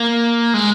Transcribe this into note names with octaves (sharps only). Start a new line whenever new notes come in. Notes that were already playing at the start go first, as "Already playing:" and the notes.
Already playing: A#3
G#3